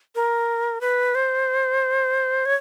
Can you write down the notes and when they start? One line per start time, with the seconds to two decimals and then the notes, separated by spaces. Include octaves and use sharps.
0.15 A#4
0.81 B4
1.15 C5
2.46 C#5